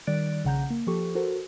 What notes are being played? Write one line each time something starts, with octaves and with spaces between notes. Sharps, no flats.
D#3 G3 D5 F#6 A6 D7
A#1 C#3 F#5 A#5 G6
A#3
F3 G4 A4 C#6
F#4 A4 A#4 C5